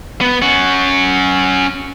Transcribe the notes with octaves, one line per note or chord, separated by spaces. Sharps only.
B3
C#4 F#5